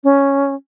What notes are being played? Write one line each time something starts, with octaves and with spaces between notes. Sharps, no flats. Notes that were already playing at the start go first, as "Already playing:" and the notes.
C#4